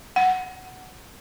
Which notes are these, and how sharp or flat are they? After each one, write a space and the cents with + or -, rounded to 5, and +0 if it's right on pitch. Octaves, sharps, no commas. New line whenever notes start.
F#5 +5